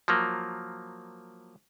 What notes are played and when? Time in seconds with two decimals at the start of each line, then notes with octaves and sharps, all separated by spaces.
0.08 F3 F#3 A#3